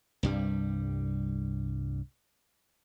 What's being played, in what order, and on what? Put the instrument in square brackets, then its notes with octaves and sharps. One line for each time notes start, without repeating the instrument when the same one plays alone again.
[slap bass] C2 G2 G3